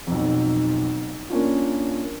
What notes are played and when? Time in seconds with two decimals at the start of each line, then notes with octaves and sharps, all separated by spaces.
0.07 B1 F2
1.30 A#3 C#4 D4 F4